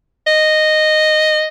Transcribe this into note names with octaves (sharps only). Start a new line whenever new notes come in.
D#5